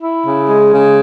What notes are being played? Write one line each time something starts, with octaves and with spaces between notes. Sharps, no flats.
E4
C#3
G#3
C#3